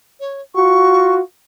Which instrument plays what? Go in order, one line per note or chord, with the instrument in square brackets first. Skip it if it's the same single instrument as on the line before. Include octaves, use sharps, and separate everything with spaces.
[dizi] C#5
[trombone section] F4 F#4 [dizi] C#6